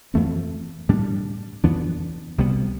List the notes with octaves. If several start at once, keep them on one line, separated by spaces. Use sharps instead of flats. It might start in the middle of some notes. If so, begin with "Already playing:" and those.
F2 E3 A3 C4
A2 G3 D4
F2 E3 B3 D4
C2 C3 G3 B3